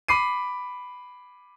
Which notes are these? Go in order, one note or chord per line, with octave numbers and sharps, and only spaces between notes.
B5 D6 C7 D#7